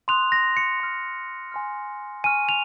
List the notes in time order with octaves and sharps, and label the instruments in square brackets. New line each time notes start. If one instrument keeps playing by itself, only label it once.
[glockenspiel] C6 D#6 F#6 F7
A#6
C#7
C6 F6
G#5 C6 F6
G#5 C#6 F6 D#7
F7